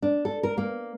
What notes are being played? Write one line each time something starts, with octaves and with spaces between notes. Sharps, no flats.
D4
A4
A#4
A#3